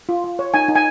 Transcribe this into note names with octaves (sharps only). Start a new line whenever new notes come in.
F4
F4
C#5
D#4 G#5
D#4
G#5